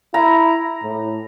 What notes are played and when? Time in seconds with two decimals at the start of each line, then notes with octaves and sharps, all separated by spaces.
0.14 E4 A#5
0.83 A2